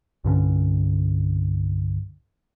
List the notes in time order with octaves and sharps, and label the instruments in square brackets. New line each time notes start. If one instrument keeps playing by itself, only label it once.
[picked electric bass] C2 G2 D3 C#4